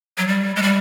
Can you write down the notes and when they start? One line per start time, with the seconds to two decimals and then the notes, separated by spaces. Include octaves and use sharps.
0.18 F#3
0.27 G3
0.56 G#3
0.63 G3